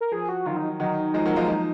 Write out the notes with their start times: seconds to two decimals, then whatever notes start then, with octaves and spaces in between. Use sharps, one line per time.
0.01 A#4
0.12 F3 G#4
0.29 F#4
0.46 D#3 F#3 F4
0.57 D#4
0.80 D#3 F#3 D#4
1.14 F3 G#3
1.26 F#3 A#3
1.36 F3 G#3 F4
1.48 F3 D#4